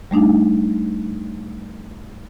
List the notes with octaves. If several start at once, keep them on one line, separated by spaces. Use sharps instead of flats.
G3 A3 D4 D#4